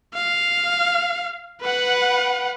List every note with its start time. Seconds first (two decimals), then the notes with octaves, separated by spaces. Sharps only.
0.14 F5
1.61 B4 F#5